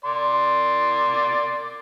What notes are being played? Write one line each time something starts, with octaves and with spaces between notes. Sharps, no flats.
D5 C6